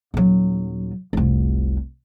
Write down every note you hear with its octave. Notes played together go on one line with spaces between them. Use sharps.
D#1 F#3
F1 C2